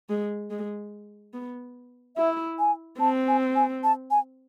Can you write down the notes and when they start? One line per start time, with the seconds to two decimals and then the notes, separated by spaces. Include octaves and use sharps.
0.09 G#3
0.51 G#3
1.34 B3
2.17 E4 E5
2.59 G#5
3.00 C4 A5
3.28 G#5
3.56 G#5
3.84 A5
4.11 G#5